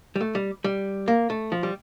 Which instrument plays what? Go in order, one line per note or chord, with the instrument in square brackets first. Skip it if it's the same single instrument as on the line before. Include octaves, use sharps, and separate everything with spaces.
[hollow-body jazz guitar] G3
A3
G3
G3
A#3
A3
F3
G3